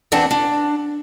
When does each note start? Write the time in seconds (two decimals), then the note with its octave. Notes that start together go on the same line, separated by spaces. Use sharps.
0.12 E2 C4 D4 F#5 A5
0.31 D4